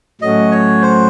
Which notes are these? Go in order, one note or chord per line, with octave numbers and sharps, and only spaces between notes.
A2 F#3 A3 C#4 F#4 D#5
C#5
C5